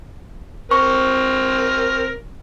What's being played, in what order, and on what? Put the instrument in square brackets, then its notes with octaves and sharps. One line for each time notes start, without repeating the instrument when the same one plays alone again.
[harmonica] C4 A#4 [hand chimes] C#6